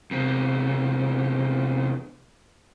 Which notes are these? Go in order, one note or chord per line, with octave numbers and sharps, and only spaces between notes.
E2 C3